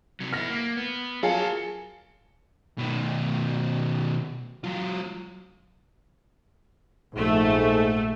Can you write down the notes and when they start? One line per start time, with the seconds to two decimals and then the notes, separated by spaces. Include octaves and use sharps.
0.20 C3 F#3
0.33 B3 E4 F6 A#6
0.50 A#3
0.77 B3
1.23 F#3 F4 G#4 A#4 A5
2.78 B2 D#3
4.64 F#3 F4
7.14 A#1 G#2 A3